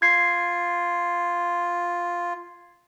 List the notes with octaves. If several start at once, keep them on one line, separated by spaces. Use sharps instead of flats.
F4 G#6 C7